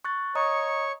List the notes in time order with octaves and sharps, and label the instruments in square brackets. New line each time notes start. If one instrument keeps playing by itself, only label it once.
[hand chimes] C#6 F#6 A6
[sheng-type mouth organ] C#5 C#6 [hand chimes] D#5 A#5 D#6